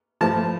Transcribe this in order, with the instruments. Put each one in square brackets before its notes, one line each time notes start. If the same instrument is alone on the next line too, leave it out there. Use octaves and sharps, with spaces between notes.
[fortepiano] A2 F3 A5